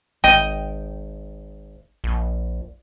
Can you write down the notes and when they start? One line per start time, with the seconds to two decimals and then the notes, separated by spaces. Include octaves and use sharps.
0.24 G#1 D#5 G5
2.04 A#1